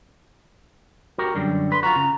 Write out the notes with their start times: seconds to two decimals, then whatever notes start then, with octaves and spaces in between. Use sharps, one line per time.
1.18 F#4 G4 A#4
1.35 F#2 D3 G3
1.72 B4 C6
1.83 F4 F#4 A#5
1.96 C#3